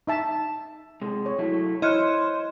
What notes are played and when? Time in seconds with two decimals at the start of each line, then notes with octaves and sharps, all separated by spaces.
0.07 D#4 E5 A5
1.02 C3 G#3
1.26 C#5
1.39 F#3 A3 E4
1.82 E4 C5 C#5 D#5 F6 F#6 G#6 C#7